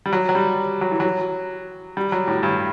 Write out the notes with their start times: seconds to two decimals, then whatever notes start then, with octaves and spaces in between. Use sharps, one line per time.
0.06 G3
0.13 F#3
0.29 F#3
0.35 G3
0.81 F#3
0.91 E3
1.00 F#3
1.97 G3
2.12 F#3
2.27 A2
2.43 G2